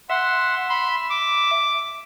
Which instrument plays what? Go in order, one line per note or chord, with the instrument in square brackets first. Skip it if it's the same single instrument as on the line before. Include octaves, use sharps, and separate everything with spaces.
[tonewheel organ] E5 [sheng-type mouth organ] F#5 C6
[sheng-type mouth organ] B5 C6
D6